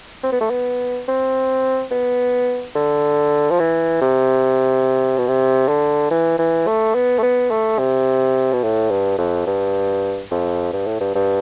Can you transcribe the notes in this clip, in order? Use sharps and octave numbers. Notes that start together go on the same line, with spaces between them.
C4
B3
A3
B3
C4
B3
D3
F3
E3
C3
B2
C3
D3
E3
E3
A3
B3
A3
B3
A3
C3
B2
A2
G2
F2
G2
F2
G2
A2
G2
G2